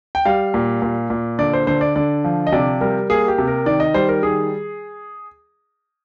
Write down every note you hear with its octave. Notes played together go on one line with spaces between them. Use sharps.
G5
G3 F5
A#2
A#2
A#2
D3 D5
C5
D3 C5
D5
D3 D5
F3
D#5
C3 D5
G3 A#4
A#3 G#4
G4
C3
A#4
D#3 D5
D#5
G3 C5
A#4
D#3 G#4